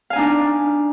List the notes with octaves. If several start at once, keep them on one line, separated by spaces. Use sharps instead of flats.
D4 D#4 F5 G#5